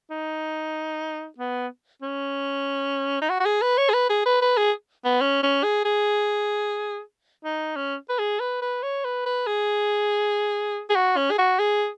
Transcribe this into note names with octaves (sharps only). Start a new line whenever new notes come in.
D#4
B3
C#4
D#4
F#4
F#4
G#4
B4
C#5
G#4
B4
G#4
B4
B4
G#4
B3
C#4
C#4
G#4
G#4
D#4
C#4
B4
G#4
B4
B4
C#5
B4
B4
G#4
G#4
F#4
C#4
G#4
F#4
G#4